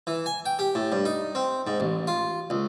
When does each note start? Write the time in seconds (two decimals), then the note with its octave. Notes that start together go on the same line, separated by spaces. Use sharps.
0.07 E3
0.26 G#5
0.46 G5
0.59 G4
0.75 A2
0.92 G2
1.05 D#4
1.35 C4
1.67 G#2
1.80 A1
2.07 F4
2.50 C#2